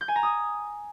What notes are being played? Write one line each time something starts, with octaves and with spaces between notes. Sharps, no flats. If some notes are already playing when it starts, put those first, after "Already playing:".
G6
G#5
A#5
D#6